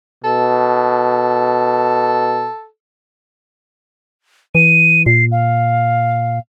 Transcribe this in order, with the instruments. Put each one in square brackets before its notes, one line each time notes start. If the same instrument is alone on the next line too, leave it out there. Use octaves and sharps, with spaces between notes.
[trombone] B2 [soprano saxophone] A4
[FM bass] E3 [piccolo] D#7
[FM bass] A#2 [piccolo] C7
[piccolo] F5